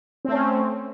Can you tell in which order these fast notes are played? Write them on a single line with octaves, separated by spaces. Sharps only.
C4 A3 C#4